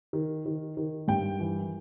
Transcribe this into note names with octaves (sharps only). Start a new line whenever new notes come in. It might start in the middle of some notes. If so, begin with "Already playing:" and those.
D#3
D#3
D#3
G2 G5
E3